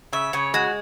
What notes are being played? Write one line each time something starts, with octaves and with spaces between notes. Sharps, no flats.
C#3 E5
C#3 C#5
G#3 F#4